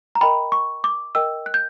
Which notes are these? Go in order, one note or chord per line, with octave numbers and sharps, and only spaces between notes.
A#5
A#4 D#5 G5 B5
C#6
D6
A#4 D#5 G5 E6
F#6
G6